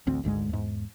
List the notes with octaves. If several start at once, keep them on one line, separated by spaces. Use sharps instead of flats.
A1 D2 C4
G#1 D2 G#2 G#3
E2 G#2